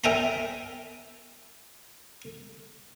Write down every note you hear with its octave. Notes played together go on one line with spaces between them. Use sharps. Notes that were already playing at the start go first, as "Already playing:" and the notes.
A#4 E5 G5 G#5 A#5 B5